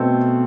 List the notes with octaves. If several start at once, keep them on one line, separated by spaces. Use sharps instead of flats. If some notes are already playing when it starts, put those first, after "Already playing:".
Already playing: B2 A3 C4 A4